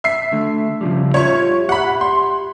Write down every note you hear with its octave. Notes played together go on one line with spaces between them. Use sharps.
E5 C7
D3 A3
C#3 F3 G3
F4 G4 C#5 E5 C#6
G4 E5 F#5 B5
C6